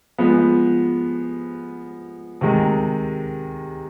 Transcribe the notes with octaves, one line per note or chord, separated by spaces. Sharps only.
F3 G#3 B3
C3 D#3 G#3